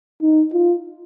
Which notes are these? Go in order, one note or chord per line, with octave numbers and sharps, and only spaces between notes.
D#4
F4